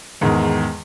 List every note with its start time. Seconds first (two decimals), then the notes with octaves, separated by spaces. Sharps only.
0.21 E2 G#2 D#3